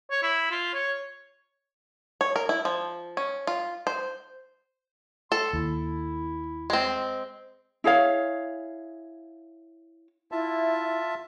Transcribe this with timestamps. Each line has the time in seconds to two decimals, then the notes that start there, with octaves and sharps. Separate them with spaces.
0.11 C#5
0.22 E4
0.51 F4
0.74 C#5
2.21 C#5
2.36 A#4
2.49 E4
2.65 F3
3.17 C#4
3.47 F4
3.87 C5
5.32 A4 C6
5.53 D#2 E4
6.70 G#3 C4
7.84 E4 G#4 C#5 F5
10.32 E4 F4 E5 A5